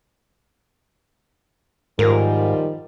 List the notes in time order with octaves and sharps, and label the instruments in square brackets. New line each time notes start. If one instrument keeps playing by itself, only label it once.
[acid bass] G#2 [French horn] D#3 [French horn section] F3 G3 F4 [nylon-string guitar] A#4